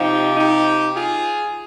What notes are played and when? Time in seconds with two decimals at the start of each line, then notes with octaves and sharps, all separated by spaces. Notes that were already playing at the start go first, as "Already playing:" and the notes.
Already playing: C3 F3 D#4 G4
0.37 D#4 G4
0.96 F4 G#4